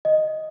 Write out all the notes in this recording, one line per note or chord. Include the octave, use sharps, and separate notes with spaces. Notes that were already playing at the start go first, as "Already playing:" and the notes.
D#5